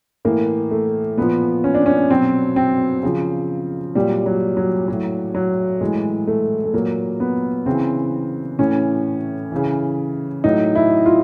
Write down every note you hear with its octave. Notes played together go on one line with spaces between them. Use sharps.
A2 E3 A#3
A3
A#2 F3 B3
C#4
D4
C#4
B2 F#3 C4
C4
C#3 F3
A#2 F#3 G3
F#3
F#3
A2 F#3
F#3
A2 E3 G#3
A3
A3
A#2 F#3 A#3
B3
C#3 E3 C4
A2 E3 C#4
C#3 E3
A2 F#3 D#4
E4
F4